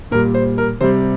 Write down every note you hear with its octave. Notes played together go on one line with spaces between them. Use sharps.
A#2 G3 A#4
C5
A#4
C3 G3 C5